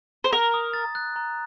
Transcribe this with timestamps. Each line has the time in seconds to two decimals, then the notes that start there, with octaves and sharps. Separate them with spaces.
0.24 C5
0.32 A#4 A#5
0.54 D#6
0.73 A6
0.95 F#6
1.16 A#5